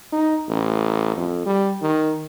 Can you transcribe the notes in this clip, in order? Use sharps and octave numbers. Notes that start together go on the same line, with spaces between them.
D#4
A1
F2
G3
D#3